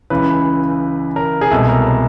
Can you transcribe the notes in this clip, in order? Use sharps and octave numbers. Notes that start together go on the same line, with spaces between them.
C#2 C#3 E3 B4
A#4
G#4
C2 B2 G#3 A4
A#4
A#4